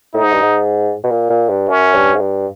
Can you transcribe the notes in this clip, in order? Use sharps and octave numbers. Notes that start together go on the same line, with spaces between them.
A2 D#4
G#2
G2
G#2
B2
A#2
A#2
G2
F#2 C#4
G2
G#2
G2